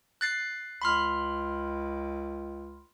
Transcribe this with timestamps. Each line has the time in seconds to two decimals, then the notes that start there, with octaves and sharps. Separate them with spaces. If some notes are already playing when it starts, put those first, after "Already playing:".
0.21 F#6 A6 C7
0.82 C#2 B5 C6 F6